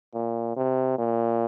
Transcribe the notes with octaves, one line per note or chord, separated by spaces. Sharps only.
A#2
C3
A#2